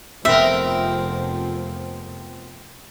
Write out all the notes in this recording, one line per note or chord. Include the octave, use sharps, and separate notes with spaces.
F1 F2 F3 B3 C4 A#4 E5